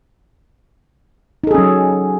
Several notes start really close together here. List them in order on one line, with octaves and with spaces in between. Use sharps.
D#4 A4 G#4 C#4 F#3